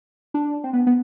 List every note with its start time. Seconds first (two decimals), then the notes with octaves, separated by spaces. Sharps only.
0.34 D4
0.64 C4
0.73 B3
0.87 B3